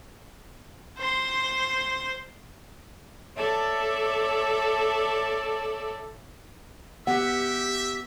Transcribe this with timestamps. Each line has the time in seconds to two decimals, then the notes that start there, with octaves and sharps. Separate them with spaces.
0.99 C5 C6
3.37 A4 C#5 D5 E5 A5
7.07 B3 G4 E5 F#5